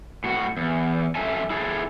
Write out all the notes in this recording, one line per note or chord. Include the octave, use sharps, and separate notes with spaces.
A2 F#4
E2
F#2 A4 E5 G#5 A5
E4 G#4 A4